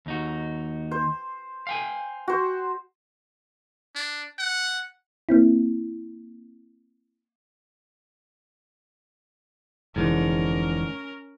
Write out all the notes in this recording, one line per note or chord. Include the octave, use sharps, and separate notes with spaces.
D#2 D#4 F#4
C5
F5 G5 G#5
F#4 C5
D4
F#5
A#3 C4 E4
F1 G#2 D3 E3 C#4 A#4